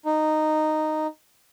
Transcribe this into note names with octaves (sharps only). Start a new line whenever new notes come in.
D#4